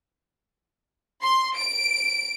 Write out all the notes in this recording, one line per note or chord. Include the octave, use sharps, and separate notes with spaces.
C6
D7